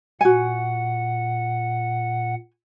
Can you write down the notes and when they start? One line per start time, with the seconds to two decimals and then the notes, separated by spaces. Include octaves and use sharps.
0.21 A#2 F#4 F#5 G#5